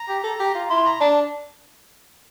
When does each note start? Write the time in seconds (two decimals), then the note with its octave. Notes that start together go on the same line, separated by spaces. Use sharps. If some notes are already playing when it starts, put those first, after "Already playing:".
Already playing: A#5
0.09 G4
0.24 A4
0.40 G4
0.55 F4
0.70 E4 C6
0.85 A#5
1.01 D4 A5